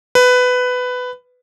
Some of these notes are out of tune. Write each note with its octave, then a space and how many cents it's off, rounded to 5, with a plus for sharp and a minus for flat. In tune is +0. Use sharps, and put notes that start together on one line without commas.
B4 +15